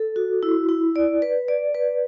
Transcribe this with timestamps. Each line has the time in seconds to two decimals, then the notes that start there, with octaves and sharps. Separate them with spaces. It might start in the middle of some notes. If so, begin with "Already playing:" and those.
Already playing: A4
0.16 F#4
0.43 E4
0.69 E4
0.96 D5
1.22 B4
1.48 D5
1.75 B4